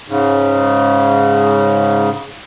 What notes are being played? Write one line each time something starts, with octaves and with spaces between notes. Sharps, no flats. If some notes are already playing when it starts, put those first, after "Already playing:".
G#2 C#3